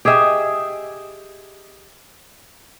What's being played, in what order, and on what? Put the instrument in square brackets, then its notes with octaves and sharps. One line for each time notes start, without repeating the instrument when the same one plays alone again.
[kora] G4 G#4 D#5 E5